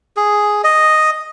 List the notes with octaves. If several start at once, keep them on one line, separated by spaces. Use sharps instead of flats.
G#4
D#5